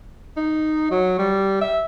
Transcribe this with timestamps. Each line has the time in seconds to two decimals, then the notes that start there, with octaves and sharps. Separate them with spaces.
0.36 D#4
0.91 F#3
1.19 G3
1.61 E5